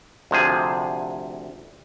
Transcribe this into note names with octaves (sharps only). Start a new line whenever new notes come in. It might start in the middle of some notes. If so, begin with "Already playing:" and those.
D2 C3 F3 G#4